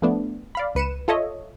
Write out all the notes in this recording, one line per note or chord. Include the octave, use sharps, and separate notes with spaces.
F3 A3 B3 D4
D5 F5 B5
C#2 B4 C#7 D#7 E7
F4 A4 C#5 D#5 E5